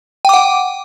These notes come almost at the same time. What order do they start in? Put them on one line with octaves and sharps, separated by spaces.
G5 D6 F#5